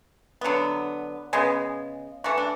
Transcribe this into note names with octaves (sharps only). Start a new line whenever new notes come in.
D3 F#3 B3
C#3 G#3 B3
E3 A3 F#4
D4